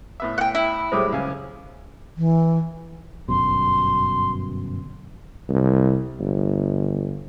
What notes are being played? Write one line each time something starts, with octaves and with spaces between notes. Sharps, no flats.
A2 B3 E5
F#5 G5
E4
A2 F#3 G3 G#4 A4 C5
C#2 F5 G#5
E3
G1 F#2 B2 C6
C2
G1